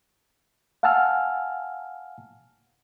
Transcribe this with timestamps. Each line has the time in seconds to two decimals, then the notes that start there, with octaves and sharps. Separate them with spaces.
0.83 F5 F#5 G#5 A5 E6 F6